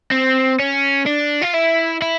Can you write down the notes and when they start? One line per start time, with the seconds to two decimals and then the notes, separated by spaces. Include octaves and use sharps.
0.11 C4
0.60 C#4
1.07 D4
1.42 F4
1.54 E4
2.02 E4